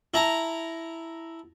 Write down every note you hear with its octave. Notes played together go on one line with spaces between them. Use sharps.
E4 A5 A#5